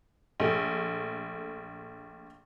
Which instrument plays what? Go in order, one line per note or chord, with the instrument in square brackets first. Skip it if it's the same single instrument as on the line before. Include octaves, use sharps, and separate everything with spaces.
[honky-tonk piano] A#1 A3